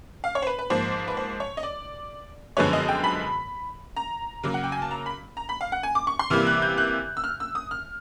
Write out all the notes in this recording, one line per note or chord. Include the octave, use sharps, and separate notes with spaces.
F5
C#5
C5
B4
B4
G#2 F3 A#3 C5
B4
C5
C#5
D#5
D5
F#2 D3 F3 G#3 B3 C#5
D#5
G5
B5
A#5
C#3 F#3 A#3
F#5
G5
G#5
A5
A#5
B5
A#5
B5
F5
F#5
G#5
D6
C#6
C6
C3 E3 G3 A#3 F6
F#6
G6
F#6
E6
F6
E6
D#6
F6